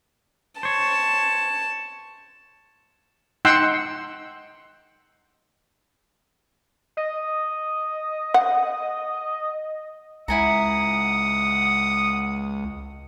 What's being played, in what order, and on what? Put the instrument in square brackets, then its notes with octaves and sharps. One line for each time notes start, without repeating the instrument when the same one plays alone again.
[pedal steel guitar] C5 C#5 [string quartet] A5
[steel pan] D#4 F#5 G5 C6 E6
[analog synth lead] D#5
[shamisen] F#5
[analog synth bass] C#2 [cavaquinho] E4 G#5 A#5 [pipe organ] F#5 [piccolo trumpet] D#6